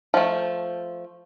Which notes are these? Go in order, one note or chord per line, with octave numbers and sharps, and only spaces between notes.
F3 A3